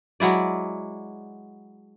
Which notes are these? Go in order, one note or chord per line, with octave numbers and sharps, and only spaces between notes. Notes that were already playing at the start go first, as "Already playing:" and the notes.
F#3 G#3 E4 D5